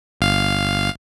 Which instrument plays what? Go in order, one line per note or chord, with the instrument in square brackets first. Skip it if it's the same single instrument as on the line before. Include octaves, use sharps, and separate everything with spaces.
[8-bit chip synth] G1 F5